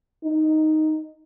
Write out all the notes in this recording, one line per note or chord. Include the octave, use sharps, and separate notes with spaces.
D#4